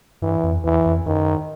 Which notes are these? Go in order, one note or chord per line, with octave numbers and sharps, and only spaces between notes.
G2 E3
F2
E2 E3
F2
F#2 D#3